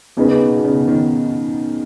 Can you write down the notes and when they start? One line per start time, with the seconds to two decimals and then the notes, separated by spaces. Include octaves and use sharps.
0.17 C#3 B3 D#4 G#4 B4
0.41 B2
0.58 B2
0.64 C#3
0.88 D#3